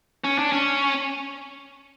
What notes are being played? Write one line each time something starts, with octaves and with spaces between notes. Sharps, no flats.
C#4
D4
C#4